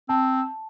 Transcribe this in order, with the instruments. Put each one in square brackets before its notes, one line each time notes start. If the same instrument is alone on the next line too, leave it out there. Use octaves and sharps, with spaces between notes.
[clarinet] C4 [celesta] A5